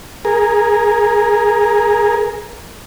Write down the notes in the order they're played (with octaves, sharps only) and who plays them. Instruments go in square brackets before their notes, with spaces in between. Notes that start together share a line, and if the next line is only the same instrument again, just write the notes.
[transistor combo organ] G#4 A#4